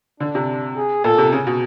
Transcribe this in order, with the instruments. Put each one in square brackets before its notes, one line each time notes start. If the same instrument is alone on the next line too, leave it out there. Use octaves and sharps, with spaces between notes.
[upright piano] D3 [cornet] D4
[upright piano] C3
[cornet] G#4
[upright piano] A#2 [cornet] A4
[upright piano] C3
C#3
B2